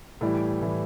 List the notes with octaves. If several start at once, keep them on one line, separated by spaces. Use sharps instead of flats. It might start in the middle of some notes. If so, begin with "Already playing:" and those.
A2 E3 G3
A2 E3 G3